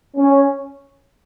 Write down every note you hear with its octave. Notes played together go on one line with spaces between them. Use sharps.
C#4